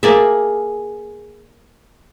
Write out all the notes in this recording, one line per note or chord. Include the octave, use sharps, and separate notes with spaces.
A#3 G#4 D5 E5